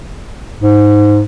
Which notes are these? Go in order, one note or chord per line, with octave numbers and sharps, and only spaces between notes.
G#2